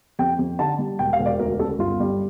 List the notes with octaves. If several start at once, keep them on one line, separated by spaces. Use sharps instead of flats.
F2 G5
F2
D3 A5
G3
E1 G5
F5
E1
D5
D2 A#4
C#3 A4
G1 F4
G3